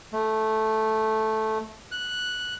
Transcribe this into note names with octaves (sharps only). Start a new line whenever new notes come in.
A3
F#6